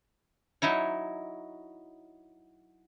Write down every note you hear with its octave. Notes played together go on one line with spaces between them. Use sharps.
F#3 D#4 E4 C#5